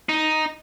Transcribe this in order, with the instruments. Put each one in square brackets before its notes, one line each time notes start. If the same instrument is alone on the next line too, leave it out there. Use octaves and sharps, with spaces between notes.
[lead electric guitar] D#4